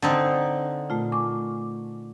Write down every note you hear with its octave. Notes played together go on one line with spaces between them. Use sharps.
D3 C4 D#4
A#2 A3 F4
G#5 C#6 D6